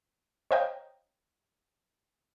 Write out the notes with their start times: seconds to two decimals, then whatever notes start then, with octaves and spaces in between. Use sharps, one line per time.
0.51 C5 C#5 D#5 F5 G5 A#5